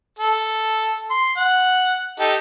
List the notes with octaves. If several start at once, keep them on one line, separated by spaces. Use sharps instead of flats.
A4
C6
F#5
D#4 G4 A4